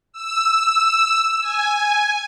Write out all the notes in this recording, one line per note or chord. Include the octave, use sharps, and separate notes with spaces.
E6
G#5